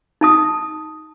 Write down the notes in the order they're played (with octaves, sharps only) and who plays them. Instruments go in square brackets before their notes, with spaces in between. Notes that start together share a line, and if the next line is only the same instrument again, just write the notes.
[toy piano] D#4 A5 D#6